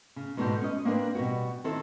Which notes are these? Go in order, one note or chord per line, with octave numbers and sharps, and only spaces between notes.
C#3
G#2 B2 D3 D4 F#4 C5
C#4 D#5
A#3 C4 D4 A#4 B4
B2 G3 F#4
D#3 C4 E4 A4